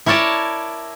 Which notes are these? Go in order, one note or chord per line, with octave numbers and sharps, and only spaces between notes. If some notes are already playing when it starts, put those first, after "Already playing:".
E4 A#4 C#5 D5 A5